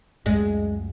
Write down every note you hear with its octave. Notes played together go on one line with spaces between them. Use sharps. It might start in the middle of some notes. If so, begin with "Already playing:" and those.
C#2 F#2 G#3